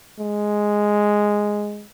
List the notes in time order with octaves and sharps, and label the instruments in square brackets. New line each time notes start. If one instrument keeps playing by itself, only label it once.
[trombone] G#3